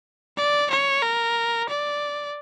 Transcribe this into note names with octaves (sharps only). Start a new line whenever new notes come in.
D5
C#5
A#4
D5